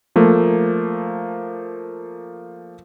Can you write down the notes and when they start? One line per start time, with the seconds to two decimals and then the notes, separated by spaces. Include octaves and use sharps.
0.16 F3 A3 A#3